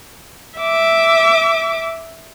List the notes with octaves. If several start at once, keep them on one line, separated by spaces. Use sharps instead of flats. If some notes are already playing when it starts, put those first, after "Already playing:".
E5 D6